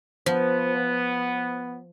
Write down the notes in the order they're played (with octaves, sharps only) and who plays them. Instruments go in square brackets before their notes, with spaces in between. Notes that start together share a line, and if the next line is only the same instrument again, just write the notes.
[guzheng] F3 [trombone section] B3